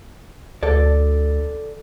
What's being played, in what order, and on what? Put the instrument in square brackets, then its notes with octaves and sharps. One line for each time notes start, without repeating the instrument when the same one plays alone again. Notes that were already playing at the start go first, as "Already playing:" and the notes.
[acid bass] D2 [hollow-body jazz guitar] A4 D5